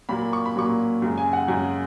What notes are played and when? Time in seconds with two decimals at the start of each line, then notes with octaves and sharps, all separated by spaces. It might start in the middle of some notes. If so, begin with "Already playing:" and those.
0.09 A#2 F#3 A#3 B5
0.33 C#6
0.46 B5
0.56 A#2 F#3 A#3 C#6
1.02 F#2 C#3 G#3
1.18 G#5
1.33 F#5
1.48 F#2 C#3 G#3 G#5